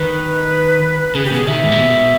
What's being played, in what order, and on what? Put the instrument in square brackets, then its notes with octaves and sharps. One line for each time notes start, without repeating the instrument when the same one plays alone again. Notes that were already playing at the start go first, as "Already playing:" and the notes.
Already playing: [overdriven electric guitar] D#3 [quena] B4
[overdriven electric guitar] C#3 [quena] G#4
[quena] G4
[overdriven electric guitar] B2 [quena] G#4
[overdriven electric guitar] D#3 [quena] E5
[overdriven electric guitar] G#2
A#2
B2